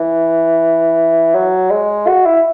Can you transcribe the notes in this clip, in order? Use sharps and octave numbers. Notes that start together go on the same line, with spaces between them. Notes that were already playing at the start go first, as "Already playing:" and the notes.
Already playing: E3
F#3
G#3
F#4
E4